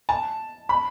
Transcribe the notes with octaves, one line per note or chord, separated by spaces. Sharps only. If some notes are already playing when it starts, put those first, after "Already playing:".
A5
B5